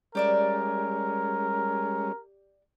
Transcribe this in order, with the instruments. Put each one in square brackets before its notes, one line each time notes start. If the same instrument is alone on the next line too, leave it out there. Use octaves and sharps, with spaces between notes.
[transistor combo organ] G3 G#3 C#4 [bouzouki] G4 D5 E5 [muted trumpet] A#4